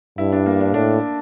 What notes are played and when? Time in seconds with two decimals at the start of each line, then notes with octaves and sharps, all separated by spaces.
0.18 G2 E4
0.32 D4
0.46 A#3
0.61 D4
0.74 A2 D4